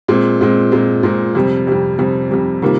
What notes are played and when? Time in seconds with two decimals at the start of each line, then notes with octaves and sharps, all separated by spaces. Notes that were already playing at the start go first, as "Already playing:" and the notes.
0.08 A#2 G#3 C4
0.41 A#2 G#3 C4
0.72 A#2 G#3 C4
1.03 A#2 G#3 C4
1.35 F2 C3 G3
1.67 F2 C3 G3
1.99 F2 C3 G3
2.31 F2 C3 G3
2.62 C3 D#3 G3 A#3 F4